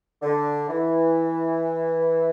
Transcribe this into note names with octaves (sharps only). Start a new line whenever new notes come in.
D3
E3